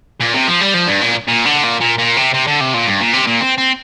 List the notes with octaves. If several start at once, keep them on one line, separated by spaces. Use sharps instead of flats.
A#2
C3
F3
G3
F3
G2
A#2
A#2
D3
A#2
A#2
A#2
C3
C3
D3
C3
A#2
G2
A#2
C3
A#2
C4
C4